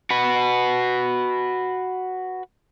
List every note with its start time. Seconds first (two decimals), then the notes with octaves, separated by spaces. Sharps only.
0.10 F#4 B4